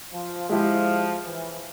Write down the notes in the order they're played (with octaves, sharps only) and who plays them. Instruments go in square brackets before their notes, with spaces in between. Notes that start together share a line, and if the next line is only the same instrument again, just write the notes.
[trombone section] F3
[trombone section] F3 [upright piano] G#3 E4 G4
[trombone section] E3